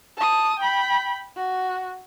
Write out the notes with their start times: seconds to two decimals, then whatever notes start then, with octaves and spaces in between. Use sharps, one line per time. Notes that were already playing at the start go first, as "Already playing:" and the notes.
0.17 A5 D#6
0.59 G5 B5
1.37 F#4